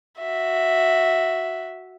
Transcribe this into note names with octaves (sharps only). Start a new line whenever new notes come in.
F#4 E5